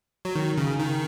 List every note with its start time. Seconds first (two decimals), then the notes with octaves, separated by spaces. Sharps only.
0.25 F#3
0.35 D#3
0.58 C#3
0.80 D#3